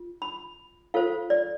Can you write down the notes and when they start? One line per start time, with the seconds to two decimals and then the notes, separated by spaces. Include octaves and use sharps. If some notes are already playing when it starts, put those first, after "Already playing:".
Already playing: F4
0.22 B5
0.94 F4 A4 C5 F5
1.30 D5